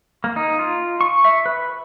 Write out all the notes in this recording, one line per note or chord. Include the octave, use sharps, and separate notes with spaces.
A#3
D#4
F4
C#6
E5
B4